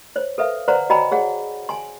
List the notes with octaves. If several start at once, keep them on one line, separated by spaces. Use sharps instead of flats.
C5 C#5
A4 B4 E5 F5
B4 C5 D5 F#5 A#5 C6
F#4 C#5 D#5 G5 A#5 B5
G#4 C#5 F#5
G#5 A5 C6